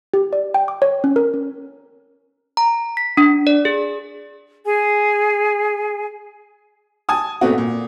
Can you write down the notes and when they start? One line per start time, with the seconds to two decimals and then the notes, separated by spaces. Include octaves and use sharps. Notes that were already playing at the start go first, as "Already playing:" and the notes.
0.14 G4
0.33 D5
0.54 G5
0.68 D6
0.82 C#5
1.04 C#4
1.16 A#4
1.34 C#4
2.57 A#5
2.97 B6
3.17 D4
3.47 D5
3.65 G#4
4.66 G#4 G#5
7.09 G#5 A5 D#6
7.41 A#2 A3 B3 C4 F#4
7.58 A#2